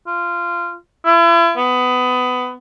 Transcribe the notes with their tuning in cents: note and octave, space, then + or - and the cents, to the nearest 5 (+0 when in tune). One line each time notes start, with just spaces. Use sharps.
F4 -15
E4 +40
B3 +20